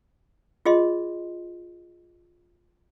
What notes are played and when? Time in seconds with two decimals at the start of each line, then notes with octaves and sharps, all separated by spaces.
0.66 F4 G#4 D#5 C6